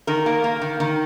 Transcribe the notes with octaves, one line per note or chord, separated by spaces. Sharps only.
D#3 A#4
A#3
A#3
D#3
D#3